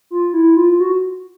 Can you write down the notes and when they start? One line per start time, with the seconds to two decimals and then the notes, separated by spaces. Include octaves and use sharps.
0.11 F4
0.33 E4
0.57 F4
0.80 F#4